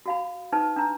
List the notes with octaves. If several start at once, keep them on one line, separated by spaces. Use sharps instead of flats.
F#4 F5 B5
D#4 B4 A5
D4 A#5